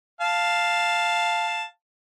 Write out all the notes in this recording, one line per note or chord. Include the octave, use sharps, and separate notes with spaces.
F5 A5